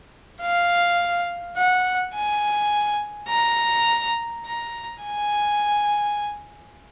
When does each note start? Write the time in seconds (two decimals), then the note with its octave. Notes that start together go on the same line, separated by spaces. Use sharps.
0.42 F5
1.57 F#5
2.15 G#5
3.30 A#5
4.46 A#5
5.03 G#5